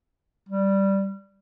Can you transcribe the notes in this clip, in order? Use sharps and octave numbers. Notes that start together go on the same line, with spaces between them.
G3